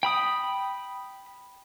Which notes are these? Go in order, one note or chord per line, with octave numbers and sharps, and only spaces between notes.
G5 B5 D#6